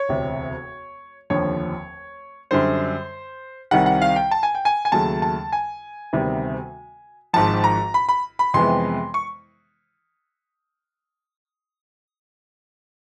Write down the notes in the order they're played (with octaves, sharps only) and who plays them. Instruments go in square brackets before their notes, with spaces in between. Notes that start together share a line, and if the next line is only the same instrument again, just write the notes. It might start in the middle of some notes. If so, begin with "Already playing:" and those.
Already playing: [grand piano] C#5
E1 D2 C3
F1 D#2 D3 F3 C#5
F#2 D3 G3 C5
C2 C3 D#3 G3 F#5
F#5
F5
G5
A5
G#5
G5
G#5
G#5
D#2 C#3 F#3 A3 A5
A5
G#5
D2 C3 D#3 G3 B3
G#1 G#2 F3 A5
A#5
B5
B5
B5
F2 C3 E3 G#3 B3 C6
C#6